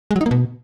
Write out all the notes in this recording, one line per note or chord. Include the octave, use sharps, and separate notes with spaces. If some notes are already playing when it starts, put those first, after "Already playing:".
G#3
F#3
D#4
A#3
B2